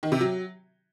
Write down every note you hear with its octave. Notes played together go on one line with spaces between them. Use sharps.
D#3
C3
F#3